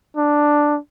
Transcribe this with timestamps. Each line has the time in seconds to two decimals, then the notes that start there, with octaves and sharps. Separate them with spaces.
0.16 D4